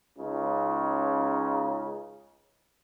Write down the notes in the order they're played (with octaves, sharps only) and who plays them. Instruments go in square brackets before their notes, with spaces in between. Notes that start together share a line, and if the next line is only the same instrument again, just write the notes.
[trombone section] C#2 C#3 D#4